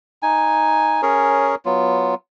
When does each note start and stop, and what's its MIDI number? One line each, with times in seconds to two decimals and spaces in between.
0.23 1.01 63
0.23 1.01 80
1.02 1.55 61
1.02 1.55 68
1.02 1.55 70
1.02 1.55 73
1.65 2.15 54
1.65 2.15 59
1.65 2.15 65